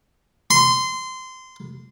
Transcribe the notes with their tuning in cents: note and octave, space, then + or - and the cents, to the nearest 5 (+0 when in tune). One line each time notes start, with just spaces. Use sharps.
C6 -20